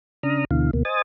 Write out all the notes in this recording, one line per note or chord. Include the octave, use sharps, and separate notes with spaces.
C#3 D4 A#5 D#6 F6
D2 B2 D3 E3 F5
D2 B2 A#3
C5 D#5 G#5 D#6 A6